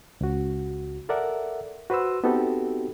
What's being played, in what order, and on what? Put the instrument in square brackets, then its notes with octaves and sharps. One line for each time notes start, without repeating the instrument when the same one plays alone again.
[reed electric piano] C#2 F#4
A4 A#4 D5 E5 F#5
F#4 B4 C5 C6 E6
B3 C4 D#4 F#4 G4 A4